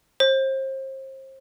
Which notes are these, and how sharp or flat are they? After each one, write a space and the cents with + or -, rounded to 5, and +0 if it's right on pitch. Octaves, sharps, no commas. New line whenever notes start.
C5 +35